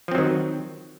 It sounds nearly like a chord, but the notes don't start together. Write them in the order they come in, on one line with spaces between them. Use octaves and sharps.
F3 C4 F#3 D#3